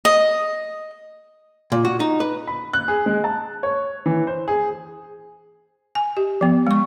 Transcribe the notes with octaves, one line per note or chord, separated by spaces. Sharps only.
D#5
A#2
F#4
D#4
B4
B5
F#6
G#4
G#3
A5
C#5
E3
C5
G#4
G#5
G4
F3 B3
G#3 C#6